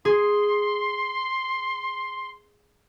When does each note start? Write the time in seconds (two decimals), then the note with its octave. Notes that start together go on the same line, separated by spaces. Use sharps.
0.05 G#4 C6